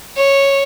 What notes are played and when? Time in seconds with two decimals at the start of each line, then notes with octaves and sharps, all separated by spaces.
0.17 C#5